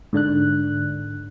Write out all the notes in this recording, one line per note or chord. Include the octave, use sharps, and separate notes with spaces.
G#2 D3 D4 F#6